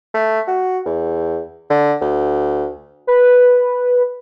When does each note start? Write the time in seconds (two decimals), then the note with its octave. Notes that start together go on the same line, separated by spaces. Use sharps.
0.14 A3
0.47 F#4
0.86 E2
1.70 D3
2.01 D2
3.07 B4